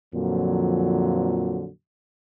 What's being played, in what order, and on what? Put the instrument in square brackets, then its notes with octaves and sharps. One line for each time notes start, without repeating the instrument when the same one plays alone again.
[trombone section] F2 A#2 D3 F3 F#3